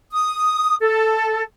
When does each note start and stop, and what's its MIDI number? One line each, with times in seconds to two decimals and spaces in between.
0.12 0.74 87
0.81 1.42 69